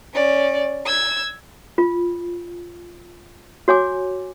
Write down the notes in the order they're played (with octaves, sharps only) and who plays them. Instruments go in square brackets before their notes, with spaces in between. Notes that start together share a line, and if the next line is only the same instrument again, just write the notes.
[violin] C#4 D5
E6 G#6
[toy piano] F4
F#4 C#5 G#5 D6